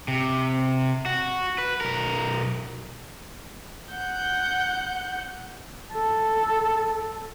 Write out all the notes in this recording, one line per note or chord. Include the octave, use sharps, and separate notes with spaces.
C3
F#4
B4
B1 A#4
F#5 G6
A4